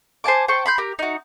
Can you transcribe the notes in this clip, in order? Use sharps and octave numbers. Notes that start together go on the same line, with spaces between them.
C5 G#5 A5 D6
C5 G5 A5 C#6
B5 C6 G6
G4 A#4
D#4 F#4